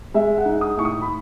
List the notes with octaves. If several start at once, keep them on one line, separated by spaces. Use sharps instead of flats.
G#3 E5
F#5
D#4
D#6
A2 C#6
D#6
B5